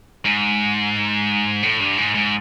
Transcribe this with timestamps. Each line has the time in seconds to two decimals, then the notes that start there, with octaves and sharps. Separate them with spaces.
0.25 G#2
1.63 A2
1.80 G2
1.98 G#2
2.15 G#2